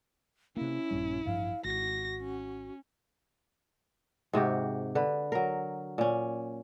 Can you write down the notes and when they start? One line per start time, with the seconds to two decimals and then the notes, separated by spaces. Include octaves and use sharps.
0.57 C3 A#3 C#4 E4
0.91 A#1 G2 G3
1.25 A1 G2 F3 F5
1.64 G#1 F#4 A#6
2.21 C#4
4.33 G#2 C3 F#4 G4
4.95 D3 B4
5.32 F#3 A#4
5.98 A#2 C#4